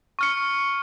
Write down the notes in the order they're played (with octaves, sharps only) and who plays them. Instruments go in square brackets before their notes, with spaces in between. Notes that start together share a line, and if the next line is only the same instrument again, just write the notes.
[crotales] C#6 F6 C#7